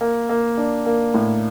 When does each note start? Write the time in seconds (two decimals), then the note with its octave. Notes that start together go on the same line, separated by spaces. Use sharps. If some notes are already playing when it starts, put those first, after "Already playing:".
0.01 A#3
0.29 A#3
0.57 D4
0.86 A#3
1.14 A2